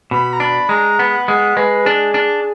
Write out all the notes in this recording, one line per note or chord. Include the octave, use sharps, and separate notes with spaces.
B2 B5
A#5
D4 B5
G#3 A#5
B3 F#5
G#3 F#5
G#3 B4
D4 G#4
D4